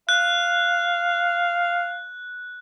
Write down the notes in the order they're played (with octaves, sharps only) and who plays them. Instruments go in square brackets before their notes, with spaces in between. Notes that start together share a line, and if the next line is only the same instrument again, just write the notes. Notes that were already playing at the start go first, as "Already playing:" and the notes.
[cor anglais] F5 [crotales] F#6